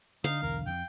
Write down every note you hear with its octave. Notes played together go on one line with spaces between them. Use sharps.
D3 D4 D#4 F5
B1 E2 A#4
F2 G5